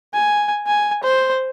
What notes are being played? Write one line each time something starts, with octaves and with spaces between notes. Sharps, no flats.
G#5
G#5
C5